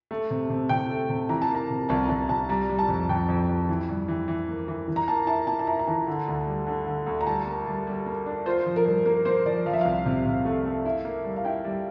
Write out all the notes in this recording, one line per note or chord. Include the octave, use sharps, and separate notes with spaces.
A3
C3
C3
C3 G5
A3
C3
E3 A#5
A5
A#3
A#5
C3
C2 A5
A#5
C2 A5
C2 A5
G3 A#5
G3
A5
F2
F2 G5
F2
F2
E3
G2
E3
E3
A#3
E3
E3
A#5
A#3 A5
E4 A5
A#3 A5
A5
E4 A#5
A#5
E3 A5
D3
D2
G3
D3
D3
D2
A#5
G3 A5
A#3
G3
G3
A#3
D4
F4 C5
F3
A#4
G2
A#3 A#4
A#3 C5
F3 D5
F3 F5
E5
C2 F5
C3
C3
A3
A3
E4
A#3
G3
F5
E4 G5
G3